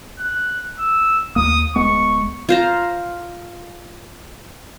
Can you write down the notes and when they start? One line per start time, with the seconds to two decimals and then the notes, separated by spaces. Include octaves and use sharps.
0.19 F#6
0.79 E6
1.36 D#2 A#3 D#6
1.76 D1 G#3 B3 C#6
2.49 F4 C5 A#5